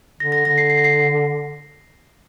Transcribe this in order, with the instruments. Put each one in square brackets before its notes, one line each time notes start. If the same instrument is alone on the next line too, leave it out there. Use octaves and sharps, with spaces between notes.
[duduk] D3 [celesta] A#6
[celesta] A#6
[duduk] D3 [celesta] A#6
[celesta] C7
C7
A#6
C7